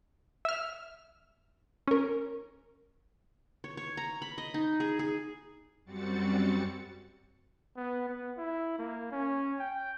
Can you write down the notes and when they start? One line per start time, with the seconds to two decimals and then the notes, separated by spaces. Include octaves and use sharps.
0.45 E5 F6
1.88 C#4 A#4
3.64 C#5
3.77 C#5
3.97 A#5
4.22 B5
4.38 D#5
4.54 D#4
4.80 G#4
4.99 G#4
5.85 F#2 G3 C4 F#4 A6 C#7
7.76 B3
8.09 B3
8.37 E4
8.78 A#3
9.12 C#4
9.59 G5